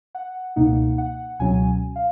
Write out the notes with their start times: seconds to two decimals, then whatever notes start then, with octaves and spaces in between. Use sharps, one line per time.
0.15 F#5
0.56 C#2 B2 A#3 D#4 F#5
0.98 F#5
1.40 C#2 B2 F#3 C#4 G#5
1.96 F5